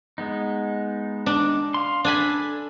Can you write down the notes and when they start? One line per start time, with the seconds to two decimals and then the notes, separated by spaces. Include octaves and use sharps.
0.18 G#3 B3 D#4
1.26 D4
1.74 F5 C6
2.04 D4 A4 G#5 B5